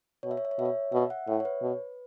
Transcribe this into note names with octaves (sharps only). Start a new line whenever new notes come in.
B2 C#5
E5
C#5
E5
C#5
B2 E5
C#5
B2 E5
F#5
A2 E5
C#5
B4
B2